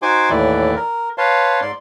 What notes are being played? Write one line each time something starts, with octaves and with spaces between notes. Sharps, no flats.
D#4 F#4 C5 G#5 C6 D6
D#2 A2 E3 E4 D5
A#4
B4 C#5 F5 A5 C6
G#2 D5 C6